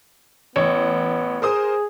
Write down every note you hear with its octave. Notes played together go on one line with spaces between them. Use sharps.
A1 B3 C#5
G#4 A#4 C5 D#6